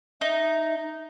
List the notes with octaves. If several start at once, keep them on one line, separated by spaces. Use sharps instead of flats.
D#4 E5